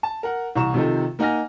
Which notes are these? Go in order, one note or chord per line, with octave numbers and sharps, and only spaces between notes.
A5
A#4 F#5
C2 E3 A#5 C#6 E7
C3 D#3 F3 D#4 A4
A#3 D#4 F#5 G#5 F6 A#6